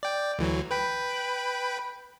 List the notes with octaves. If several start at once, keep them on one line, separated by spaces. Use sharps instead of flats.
D5 G5
D2 E3 F#3
B4 G5 B5